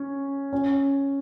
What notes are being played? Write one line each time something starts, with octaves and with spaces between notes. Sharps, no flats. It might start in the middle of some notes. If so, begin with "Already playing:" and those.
Already playing: C#4
C#4